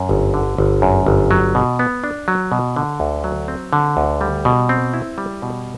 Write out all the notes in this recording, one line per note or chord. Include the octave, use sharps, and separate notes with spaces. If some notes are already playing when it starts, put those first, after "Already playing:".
Already playing: F#2
G1
D3
G1
F#2
G1
F#3
B2
B3
D4
F#3
B2
D3
D2
F#3
C4
D3
D2
G3
B2
C4
E4
G3
B2